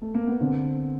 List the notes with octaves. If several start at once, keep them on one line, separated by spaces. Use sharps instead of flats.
A3
A#3
B3
D3 C4